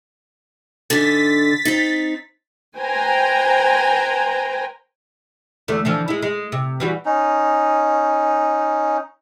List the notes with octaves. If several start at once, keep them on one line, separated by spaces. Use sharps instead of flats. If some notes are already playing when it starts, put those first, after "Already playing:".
G#2 D3 A6 B6
C4 D#4
B4 C5 G5 G#5 A#5
E2 D3 A3
D3 E3 F3
G#3 E4
G#3
C3
E3 G3 F#4
C#4 D#4